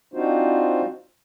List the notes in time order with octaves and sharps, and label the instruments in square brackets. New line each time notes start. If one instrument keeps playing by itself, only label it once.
[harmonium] C4 D4 D#4 F4 F#4 C5